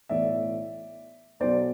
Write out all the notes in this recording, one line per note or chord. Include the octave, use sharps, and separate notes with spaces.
B1 A2 E3 D5 E5
B1 B2 F#3 C5 D5